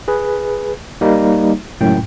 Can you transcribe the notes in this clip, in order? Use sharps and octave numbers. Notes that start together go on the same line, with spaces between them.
G#4 B4
G3 A#3 D#4
C#2 F#2 A2 G5